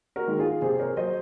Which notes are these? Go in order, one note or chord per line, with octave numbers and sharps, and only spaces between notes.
F#4 A#4
D#3 G#3
F4 G#4
C3 G#4 C5
A#4 C#5
F#3 C5 D#5